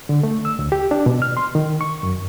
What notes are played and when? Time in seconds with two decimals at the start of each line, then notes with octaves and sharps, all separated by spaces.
0.09 D3
0.23 A3
0.45 E6
0.59 D2
0.72 G4
0.91 D4
1.06 B2
1.22 F6
1.37 C6
1.55 D#3
1.81 C#6
2.03 F#2